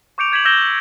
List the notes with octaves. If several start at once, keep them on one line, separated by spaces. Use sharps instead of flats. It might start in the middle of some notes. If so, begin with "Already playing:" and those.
C#6 D6 G6 C#7 D7 F7
G6 G#6 B6 E7 F#7
E6 G6 A#6 E7 F7 G7
F#7